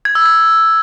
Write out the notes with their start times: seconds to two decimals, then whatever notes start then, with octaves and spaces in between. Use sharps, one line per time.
0.05 G#6
0.15 E6
0.25 G#6